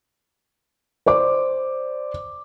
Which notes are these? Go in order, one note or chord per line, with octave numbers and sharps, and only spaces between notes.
C5 D5 D6